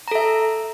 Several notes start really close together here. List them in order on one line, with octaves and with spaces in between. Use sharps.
A#5 A4 E5